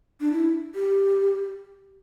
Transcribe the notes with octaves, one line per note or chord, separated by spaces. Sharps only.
D4
E4
G4